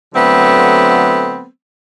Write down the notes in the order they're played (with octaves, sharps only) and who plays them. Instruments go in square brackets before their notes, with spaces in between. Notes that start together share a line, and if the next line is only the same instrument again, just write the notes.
[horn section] D3 F#3 A3 B3 C4